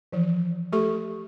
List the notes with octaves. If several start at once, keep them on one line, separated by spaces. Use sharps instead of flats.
E3 F3
A3 G4 A4 C#6